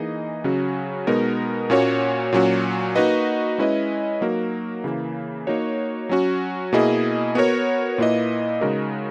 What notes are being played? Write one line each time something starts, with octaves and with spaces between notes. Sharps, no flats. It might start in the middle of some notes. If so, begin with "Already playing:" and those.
Already playing: E3 A#3 D#4 G#4 D#5
C#3 F#3 C#4 F#4
B2 G#3 B3 D#4 A#4
A#2 A#3 C#4 F#4 C#5
A#2 F#3 C#4 F#4
A#3 D#4 F#4 B4 D#5
G#3 C#4 E4 B4 D#5
F#3 A#3 D#4 F#4 A#4
C#3 E3 A#3
A#3 D#4 F#4 C#5
F#3 C#4 F#4
B2 A#3 E4 G#4 D#5
B3 F#4 A#4 C#5
A#2 A#3 E4 B4 D#5
C#3 G#3 D#4 F#4 A#4